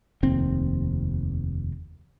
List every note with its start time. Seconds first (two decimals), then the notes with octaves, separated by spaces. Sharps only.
0.23 F1 D#2 C4